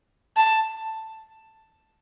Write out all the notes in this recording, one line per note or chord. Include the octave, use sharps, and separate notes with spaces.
A5